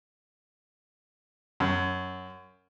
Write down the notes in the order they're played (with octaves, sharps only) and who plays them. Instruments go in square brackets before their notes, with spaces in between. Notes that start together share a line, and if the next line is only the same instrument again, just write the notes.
[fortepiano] F#2